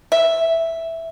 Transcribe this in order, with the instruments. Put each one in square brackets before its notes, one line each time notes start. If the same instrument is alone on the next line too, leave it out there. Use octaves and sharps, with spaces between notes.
[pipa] E5